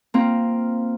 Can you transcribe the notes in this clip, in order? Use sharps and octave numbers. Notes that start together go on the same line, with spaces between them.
A#3 C4 F4